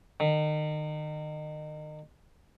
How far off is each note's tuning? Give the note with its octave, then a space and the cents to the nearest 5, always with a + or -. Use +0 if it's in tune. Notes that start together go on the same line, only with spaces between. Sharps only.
D#3 -30